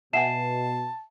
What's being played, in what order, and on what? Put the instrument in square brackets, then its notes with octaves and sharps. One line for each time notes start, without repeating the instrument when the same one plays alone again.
[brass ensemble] B2 [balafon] E5 F#5 G#5 [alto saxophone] A5 [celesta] C7 E7